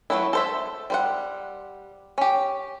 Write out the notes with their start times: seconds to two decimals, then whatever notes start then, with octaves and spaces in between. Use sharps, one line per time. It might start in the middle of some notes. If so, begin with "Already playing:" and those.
0.10 F#3 G3 A3 B3 E4
0.33 A4 C5 E5
0.90 G3 C5 F#5
2.18 C#4 G4